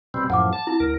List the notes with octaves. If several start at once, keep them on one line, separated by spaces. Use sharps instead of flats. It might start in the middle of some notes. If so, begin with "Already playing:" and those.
B2 G3 C4
F#2 A2 F3 F#5 D6
A5
E4
D2 A#4